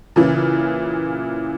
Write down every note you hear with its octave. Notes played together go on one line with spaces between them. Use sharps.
A#2 C#3 E3